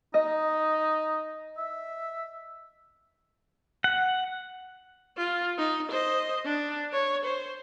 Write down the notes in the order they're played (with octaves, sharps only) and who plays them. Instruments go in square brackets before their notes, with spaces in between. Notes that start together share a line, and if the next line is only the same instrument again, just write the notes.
[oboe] D#4 [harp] D#5
[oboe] E5
[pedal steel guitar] F#5
[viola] F4
D#4
C5 D#5
D4
C#5
C5